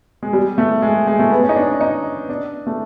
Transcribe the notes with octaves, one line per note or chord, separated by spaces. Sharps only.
G#3
G3
A3
G#3
G#3
A3
B3
C#4
D#4
D4
D4
D#4
D4
A3